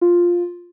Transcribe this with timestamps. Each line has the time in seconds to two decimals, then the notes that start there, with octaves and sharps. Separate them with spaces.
0.01 F4